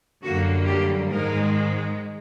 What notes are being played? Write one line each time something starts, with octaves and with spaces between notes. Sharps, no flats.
F#2 D3 G3 A#3 F#4
G4
G#2 D#3 G#3 A#4